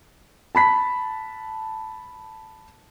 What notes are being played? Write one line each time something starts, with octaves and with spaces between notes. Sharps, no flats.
A5 B5 B6